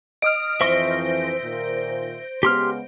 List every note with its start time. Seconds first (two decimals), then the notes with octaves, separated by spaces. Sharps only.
0.22 D#5 D#6 F6 D7
0.61 F2 E3 C5 E5 C#6 A#6
1.41 A#2 D#3
2.43 C#3 G#3 B3 G4 C6 F6